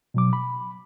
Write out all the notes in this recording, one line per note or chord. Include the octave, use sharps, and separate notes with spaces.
B2 F#3 D6
B5